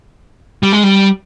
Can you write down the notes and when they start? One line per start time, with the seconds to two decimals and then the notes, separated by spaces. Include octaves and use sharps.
0.63 G3
0.73 G#3
0.83 G3